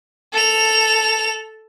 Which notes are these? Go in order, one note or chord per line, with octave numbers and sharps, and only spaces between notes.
A4 F7